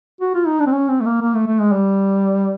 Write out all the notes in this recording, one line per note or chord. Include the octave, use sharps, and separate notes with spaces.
F#4
F4
D#4
D4
C4
C#4
C4
A3
A#3
A#3
A3
A3
G#3
G3